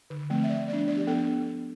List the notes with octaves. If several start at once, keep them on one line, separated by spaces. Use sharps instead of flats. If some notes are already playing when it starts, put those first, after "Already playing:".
D3
F3 A3 C4
E5
F3 D5
B3 D4 D5
F3 D5
G4
B3 D4 A4